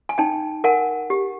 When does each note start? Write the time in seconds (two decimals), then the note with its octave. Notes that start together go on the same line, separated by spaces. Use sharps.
0.09 G#5
0.18 D#4 G5 A5
0.64 A#4 F#5 G#5
1.10 G4